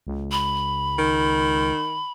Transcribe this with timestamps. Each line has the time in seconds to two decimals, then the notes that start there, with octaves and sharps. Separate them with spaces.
0.07 C#2
0.32 B5
0.98 D#3